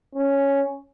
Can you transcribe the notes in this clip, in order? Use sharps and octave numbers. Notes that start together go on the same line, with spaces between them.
C#4